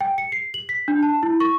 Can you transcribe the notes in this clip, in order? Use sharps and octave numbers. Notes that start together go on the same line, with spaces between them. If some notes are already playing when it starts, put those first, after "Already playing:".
G5
C#7
C7
F#7
B6
D4
A5
E4
C#6